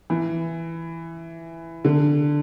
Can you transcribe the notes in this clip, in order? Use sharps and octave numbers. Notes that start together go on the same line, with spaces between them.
E3
D3